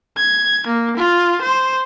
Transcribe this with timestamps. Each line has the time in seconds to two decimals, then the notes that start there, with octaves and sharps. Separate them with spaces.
0.17 G#6
0.67 A#3
0.97 F4
1.42 C5